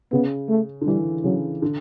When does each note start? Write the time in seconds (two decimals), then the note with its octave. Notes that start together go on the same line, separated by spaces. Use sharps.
0.12 C#3 B3
0.49 A3
0.81 D3
0.86 E3 G3
1.24 C#3 F#3
1.62 D3